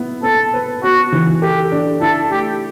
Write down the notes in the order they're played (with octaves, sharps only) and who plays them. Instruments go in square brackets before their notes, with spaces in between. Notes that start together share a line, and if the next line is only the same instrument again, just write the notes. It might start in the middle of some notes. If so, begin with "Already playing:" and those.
Already playing: [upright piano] B3 E4
[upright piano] B3 [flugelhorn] A4
[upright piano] B4
[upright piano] B3 [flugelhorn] F#4
[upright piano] E3
[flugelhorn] G4 [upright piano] A4
[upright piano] D4
[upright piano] E4 [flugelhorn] A4
[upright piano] A3 [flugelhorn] G4